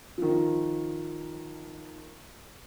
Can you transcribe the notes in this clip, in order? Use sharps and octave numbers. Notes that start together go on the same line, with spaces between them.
D#3 F3